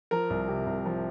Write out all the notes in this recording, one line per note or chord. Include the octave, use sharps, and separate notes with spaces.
F3 A#4 A#5
C2
C3
C2
F3